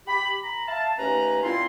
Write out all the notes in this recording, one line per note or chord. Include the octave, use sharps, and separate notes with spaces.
G4 B5
A#5 B5
E5 F5 A5
D#2 A3 C#4 B4 A#5
A#2 C4 E4 F4 C6